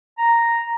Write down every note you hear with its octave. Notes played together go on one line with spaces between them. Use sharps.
A#5